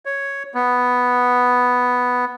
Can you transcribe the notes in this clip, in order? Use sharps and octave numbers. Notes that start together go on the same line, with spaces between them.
C#5
B3